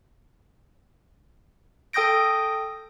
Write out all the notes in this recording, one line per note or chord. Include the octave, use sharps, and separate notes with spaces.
A4 G5 D#6 G6 A#6 D7